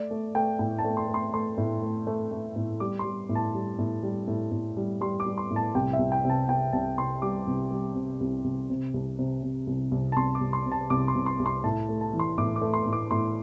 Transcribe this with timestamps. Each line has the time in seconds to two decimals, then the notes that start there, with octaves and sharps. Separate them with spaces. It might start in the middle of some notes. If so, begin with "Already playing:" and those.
Already playing: A3 D5
0.11 A3
0.35 A3 G5
0.59 A2 G5
0.79 A5
0.85 A3
0.97 C6
1.08 A3
1.14 C6
1.34 A3 C6
1.58 A2
1.83 A3
2.07 A3
2.31 A3
2.56 A2
2.80 G3 D6
2.99 C6
3.04 G3
3.29 A2
3.35 A5
3.54 G3
3.79 A2
4.03 G3
4.28 A2
4.52 A2
4.77 G3
5.01 G3 C6
5.20 D6
5.26 G3
5.38 C6
5.50 A2
5.56 A5
5.75 C2 G5
5.93 E5
5.99 C2
6.12 G5
6.24 C3
6.30 A5
6.48 C3 G5
6.73 C2 A5
6.98 C3 C6
7.22 G3 D6
7.47 C2
7.71 G3
7.95 C3
8.20 C2
8.44 C2
8.69 C3
8.94 C2
9.19 C3
9.43 C3
9.67 C2
9.91 C2
10.12 A5
10.16 C2 C6
10.35 D6
10.41 C2
10.53 C6
10.66 C3
10.72 A5
10.90 C2 D6
11.08 C6
11.15 C2
11.26 C6
11.39 C2
11.46 C6
11.64 A2 A5
11.89 A3
12.01 A5
12.13 E3
12.19 C6
12.38 A2 D6
12.56 D6
12.61 A3
12.74 C6
12.86 A2
12.93 D6
13.11 A2 C6